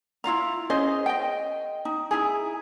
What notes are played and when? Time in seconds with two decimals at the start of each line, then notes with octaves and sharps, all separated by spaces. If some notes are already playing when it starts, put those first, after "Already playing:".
0.24 E4 F4 F5 A#5
0.70 C#4 G#4 C5 D#5
1.06 D#5 G5
1.85 D#4
2.11 D#4 E4 G#4